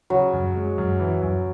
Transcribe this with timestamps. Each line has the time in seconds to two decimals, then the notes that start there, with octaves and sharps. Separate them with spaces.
0.10 C#3 F#3
0.33 F#2
0.55 G#3
0.78 F#2
1.00 E3
1.22 F#2